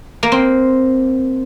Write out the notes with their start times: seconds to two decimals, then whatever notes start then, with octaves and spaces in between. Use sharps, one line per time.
0.23 A#3
0.32 C4